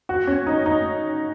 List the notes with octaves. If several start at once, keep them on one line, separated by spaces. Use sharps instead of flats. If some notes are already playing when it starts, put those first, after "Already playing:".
F#4
C#4
D#4
D#4